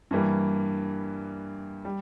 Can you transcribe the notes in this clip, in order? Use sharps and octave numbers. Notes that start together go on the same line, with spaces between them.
G2 E3 G3 A#3
G3